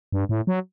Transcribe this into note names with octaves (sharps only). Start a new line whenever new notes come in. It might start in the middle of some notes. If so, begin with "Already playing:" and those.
G2
A2
F#3